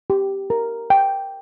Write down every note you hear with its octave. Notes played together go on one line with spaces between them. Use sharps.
G4
A#4
G5